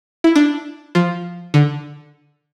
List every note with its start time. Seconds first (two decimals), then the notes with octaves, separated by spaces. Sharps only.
0.24 E4
0.36 D4
0.95 F3
1.54 D3